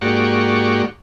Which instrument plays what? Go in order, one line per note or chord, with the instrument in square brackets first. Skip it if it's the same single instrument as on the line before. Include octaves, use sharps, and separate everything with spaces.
[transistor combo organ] G#2 A#3 F#4 G4 D5 C#6